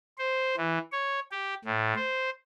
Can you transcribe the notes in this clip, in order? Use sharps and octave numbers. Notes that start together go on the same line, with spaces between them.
C5
E3
C#5
G4
A2
C5